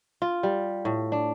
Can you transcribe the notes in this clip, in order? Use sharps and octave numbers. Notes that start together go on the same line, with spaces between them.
F4
G3
A2
D4